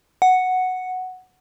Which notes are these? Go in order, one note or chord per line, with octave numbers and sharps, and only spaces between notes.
F#5